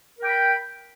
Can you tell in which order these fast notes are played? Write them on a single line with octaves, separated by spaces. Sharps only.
A#4 G5 B5